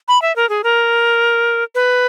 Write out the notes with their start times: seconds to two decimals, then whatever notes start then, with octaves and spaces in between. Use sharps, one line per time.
0.08 B5
0.22 E5
0.36 A#4
0.49 G#4
0.64 A#4
1.75 B4